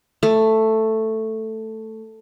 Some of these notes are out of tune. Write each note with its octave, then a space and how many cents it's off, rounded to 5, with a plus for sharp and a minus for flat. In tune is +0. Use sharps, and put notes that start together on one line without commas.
A3 +5